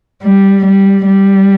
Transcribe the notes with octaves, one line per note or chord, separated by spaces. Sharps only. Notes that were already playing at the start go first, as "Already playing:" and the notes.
G3
G3
G3